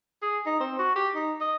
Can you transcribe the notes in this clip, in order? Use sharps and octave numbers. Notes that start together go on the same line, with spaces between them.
G#4
D#4
C4
F#4
G4
D#4
D#5